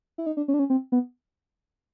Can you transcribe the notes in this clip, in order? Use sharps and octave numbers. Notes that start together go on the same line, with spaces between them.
E4
D#4
D4
C#4
D4
C#4
C4
B3